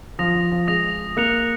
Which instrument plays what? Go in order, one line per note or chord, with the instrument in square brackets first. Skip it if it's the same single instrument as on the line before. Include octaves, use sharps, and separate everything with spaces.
[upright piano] F3 [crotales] D#6 A#6 F7
[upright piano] F3
F3
[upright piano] G#3 [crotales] D#6 A#6 F7
[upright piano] A#3 [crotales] D#6 F#6 C#7 F7